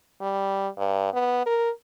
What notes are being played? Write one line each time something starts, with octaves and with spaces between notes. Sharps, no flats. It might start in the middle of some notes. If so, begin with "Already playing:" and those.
G3
G2
B3
A#4